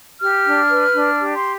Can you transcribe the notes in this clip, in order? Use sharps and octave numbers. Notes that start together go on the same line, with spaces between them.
G4 F6
D4
B4
D4
G4
C6